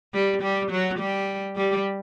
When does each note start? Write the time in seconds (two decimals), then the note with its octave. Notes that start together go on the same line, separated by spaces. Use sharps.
0.14 G3 G4
0.42 G3 G4
0.71 F#3 F#4
0.99 G3 G4
1.56 G3 G4